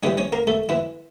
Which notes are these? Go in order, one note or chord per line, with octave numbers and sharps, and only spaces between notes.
C#3 E3 G3 C#4 C#5
C#4 C#5
A#3 A#4
A3 A4
E3 E4